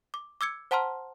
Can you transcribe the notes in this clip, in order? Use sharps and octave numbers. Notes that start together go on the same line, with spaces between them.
D6
D6 E6 G#6 C#7
C5 F#5 A5 A#5 C6 F6